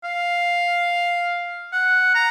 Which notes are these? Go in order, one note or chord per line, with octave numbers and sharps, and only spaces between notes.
F5
F#5
A#5